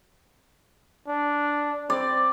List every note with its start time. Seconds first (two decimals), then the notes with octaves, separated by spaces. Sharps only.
1.08 D4
1.90 C4 D5